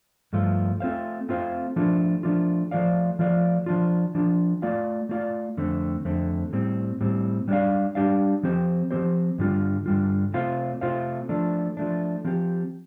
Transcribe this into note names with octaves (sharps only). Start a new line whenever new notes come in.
G2 F3 A3 F4
A3 C4 F4 C5 F5
A3 C4 F4 C5 F5
F3 A3 D4 F4
F3 A3 D4 F4
F3 A3 F4 D5 F5
F3 A3 F4 D5 F5
F3 D4 F4
F3 D4 F4
A3 F4 D5 F5
A3 F4 D5 F5
F2 D3 A3 C4
F2 D3 A3 C4
A2 G3 C4
A2 G3 C4
G3 D4 G4 D5 F5
G3 D4 G4 D5 F5
F3 C4 G4 C5
F3 C4 G4 C5
G2 D3 G3 F4
G2 D3 G3 F4
C3 A3 F4 C5 F5
C3 A3 F4 C5 F5
F3 A3 D4
F3 A3 D4
F3 C4 G4